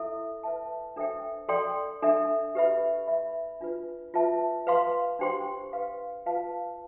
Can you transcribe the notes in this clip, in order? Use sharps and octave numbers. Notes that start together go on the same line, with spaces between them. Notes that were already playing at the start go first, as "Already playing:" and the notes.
Already playing: E4 A4 E5
B4 E5 A5
D4 A4 C5 E5 G5
A4 D5 G5 C6
D4 A4 E5
G4 B4 E5 B5
B4 E5 B5
D4 F4 B4
F4 B4 E5 A5
B4 F5 C6
D4 G4 C5 G5 C6
B4 F5 C6
F4 B4 F5 A5